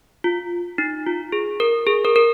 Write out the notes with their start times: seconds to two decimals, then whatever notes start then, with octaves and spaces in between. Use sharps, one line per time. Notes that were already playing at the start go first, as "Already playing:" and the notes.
0.24 F4
0.78 D#4
1.06 F4
1.32 G#4
1.60 A#4
1.87 G#4
2.05 A#4
2.16 A#4